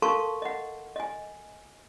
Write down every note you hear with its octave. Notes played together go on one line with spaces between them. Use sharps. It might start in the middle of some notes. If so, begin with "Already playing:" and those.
A4 A#4 F5 A5 C6 C#6
D#5 F#5
D#5 G#5